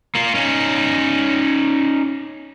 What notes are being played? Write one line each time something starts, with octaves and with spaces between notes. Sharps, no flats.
A#3 F4
C#4 D#4